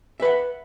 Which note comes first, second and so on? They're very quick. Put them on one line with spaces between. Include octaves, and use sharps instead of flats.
E5 B4 F#5